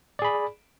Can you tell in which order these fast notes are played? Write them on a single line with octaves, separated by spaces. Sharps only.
D5 G#4 B5